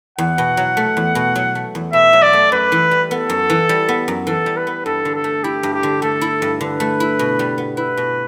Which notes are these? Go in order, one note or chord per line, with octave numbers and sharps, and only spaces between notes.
E2 F#5
B2
F#3
A3
E2
B2
F#3
A3
E2
B2 E5
F#3
D5
A3
F#2 B4
E3
G3
B3 A4
F#2
E3
G3
B3
F#2
E3 A4
G3
B4
B3
G2 A4
D3
A4
A3
E4 G4
G2
G4
D3
A3 A4
E4
G2
D3 B4
A3
E4
B2
G3
B3
E4 B4
B2